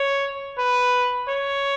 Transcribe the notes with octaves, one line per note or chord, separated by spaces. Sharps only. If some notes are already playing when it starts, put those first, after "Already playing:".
Already playing: C#5
B4
C#5